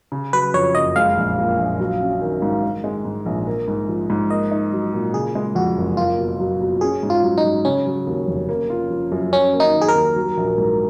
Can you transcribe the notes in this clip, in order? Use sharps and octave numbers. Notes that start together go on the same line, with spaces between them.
C#3
F#3 B4
F2 C#5
F#1 D#5
G#3 F5
A#1
A#2
A#1
F#3
C#4
D#3
G#2
D#3
G#3
G#2
A#1
A#3
G#2
F3
G#2
A#3 D#5
D#4
F#3
A#2
C#3 G#4
G#3
F2 F#4
F#1
A#3 F4
B2
F#3
B2
C#4 G#4
G#2
F4
F#3
D#4
G#2
C#3 C#4
F#3
D#2
F1
A#3
F4
F3
F#2
F#3 C#4
A#3
D#4
D#3
G#4
A#4
D#2
F#3
A#1
G#2